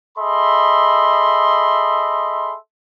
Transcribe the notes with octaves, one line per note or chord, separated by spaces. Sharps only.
G#4 A4 D#5 E5 B5 C6